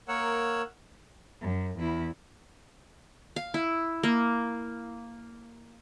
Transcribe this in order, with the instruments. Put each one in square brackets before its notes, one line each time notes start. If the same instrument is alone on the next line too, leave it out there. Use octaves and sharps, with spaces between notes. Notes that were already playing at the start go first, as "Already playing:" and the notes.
[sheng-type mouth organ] A#3 A#4 C#5 F#5 E6
[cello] F#2
E2 E4
[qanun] F5
E4
A#3